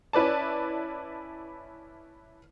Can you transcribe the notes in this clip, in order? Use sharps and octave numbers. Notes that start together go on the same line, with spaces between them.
C#4 E4 B4 D5 A5